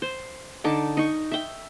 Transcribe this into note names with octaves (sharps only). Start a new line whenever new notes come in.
C5
D3 D#4 A5 D6
D#4 C#6
E5 G5